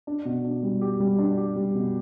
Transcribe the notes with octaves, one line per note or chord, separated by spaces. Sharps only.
D4
B2
D4
G3
G4
G3
D4
G4
G3
B2